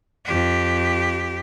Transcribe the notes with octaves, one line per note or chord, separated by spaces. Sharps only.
F2 G4